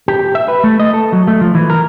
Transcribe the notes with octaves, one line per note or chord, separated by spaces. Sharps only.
G4
E5
B4
A3
D#5
A4
F#3
A3
F3
E3
A#4